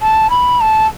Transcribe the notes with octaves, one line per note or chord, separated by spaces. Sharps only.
A5
B5
A5